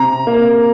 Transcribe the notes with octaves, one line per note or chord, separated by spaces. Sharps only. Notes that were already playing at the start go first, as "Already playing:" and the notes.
Already playing: C3 A#5
A#3